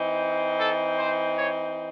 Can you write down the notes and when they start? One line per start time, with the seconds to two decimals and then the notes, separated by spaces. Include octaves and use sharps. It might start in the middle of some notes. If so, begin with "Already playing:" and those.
Already playing: E3 C4 D#4
0.59 A4
0.98 C5
1.37 C#5